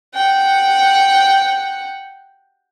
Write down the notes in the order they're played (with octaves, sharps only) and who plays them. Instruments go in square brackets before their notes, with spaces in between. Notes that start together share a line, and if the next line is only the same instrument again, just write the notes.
[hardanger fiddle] F#5 G5